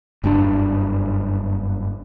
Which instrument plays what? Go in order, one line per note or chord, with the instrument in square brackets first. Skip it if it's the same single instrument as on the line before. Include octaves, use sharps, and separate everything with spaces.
[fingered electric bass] F#1 G2 C#4 D4